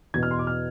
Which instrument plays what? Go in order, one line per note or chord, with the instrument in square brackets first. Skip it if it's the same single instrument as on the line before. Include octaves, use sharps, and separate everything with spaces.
[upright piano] E2 B2 G#6
F6
C6
D6
F6